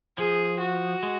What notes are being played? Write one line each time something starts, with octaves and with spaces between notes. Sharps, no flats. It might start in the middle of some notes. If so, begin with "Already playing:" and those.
F3 G#4
F#4
G#3